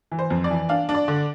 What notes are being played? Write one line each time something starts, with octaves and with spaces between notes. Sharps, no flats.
E3
C5
F2
D5
E3
D4 F5
D4
D5
D3